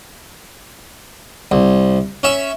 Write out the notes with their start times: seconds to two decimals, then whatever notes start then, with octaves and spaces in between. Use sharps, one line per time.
1.51 C2
2.23 C#4 E5